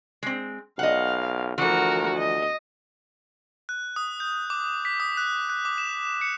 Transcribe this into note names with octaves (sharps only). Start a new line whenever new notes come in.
G#3 C4
B1 D#5 F5 F#5
D2 E3 F3 F#4 A#4
D#5
F#6
D#6
G6
D6
B6
D#6
F#6
F#6
D6
E7
C#7